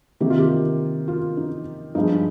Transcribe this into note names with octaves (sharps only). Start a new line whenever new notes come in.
C3 D#3 A#3 G4
F4
G4
F4
D#4
G2 F3 G#3 D#4